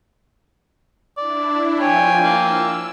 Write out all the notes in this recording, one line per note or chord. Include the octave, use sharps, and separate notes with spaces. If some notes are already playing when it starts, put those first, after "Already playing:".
D4 E4 D5
F3 F4 C#5 G5 G#5
A#3 E6